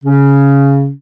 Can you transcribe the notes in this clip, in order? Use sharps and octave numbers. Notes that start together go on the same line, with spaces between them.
C#3 C#4